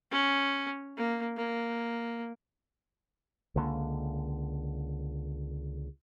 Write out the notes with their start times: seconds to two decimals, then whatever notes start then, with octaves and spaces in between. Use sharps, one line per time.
0.11 C#4
0.97 A#3
1.37 A#3
3.56 C#2 D3 A#3